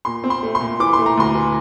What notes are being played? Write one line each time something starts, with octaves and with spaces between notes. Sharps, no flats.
A#2 C6
C4
C6
A3
C6
A#2
E3 D6
C6
A3
A#5
D2 C6
E3